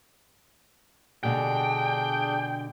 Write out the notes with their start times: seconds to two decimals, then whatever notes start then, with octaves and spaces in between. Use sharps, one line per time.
1.23 B2 D3 G3 D4 G#4 G5